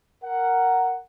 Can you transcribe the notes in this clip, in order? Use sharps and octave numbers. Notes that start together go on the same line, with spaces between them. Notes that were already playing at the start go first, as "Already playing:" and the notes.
A#4 F#5